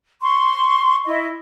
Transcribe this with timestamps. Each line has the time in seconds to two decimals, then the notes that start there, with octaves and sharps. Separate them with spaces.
0.22 C6 C#6
1.05 E4 D#5